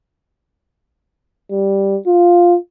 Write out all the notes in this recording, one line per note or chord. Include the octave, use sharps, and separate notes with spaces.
G3
F4